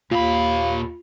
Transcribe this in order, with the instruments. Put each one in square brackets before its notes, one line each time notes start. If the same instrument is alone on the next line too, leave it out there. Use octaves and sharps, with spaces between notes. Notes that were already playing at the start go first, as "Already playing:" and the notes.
[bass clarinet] D#2 [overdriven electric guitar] A#2 B5 [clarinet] A#3 [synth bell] F4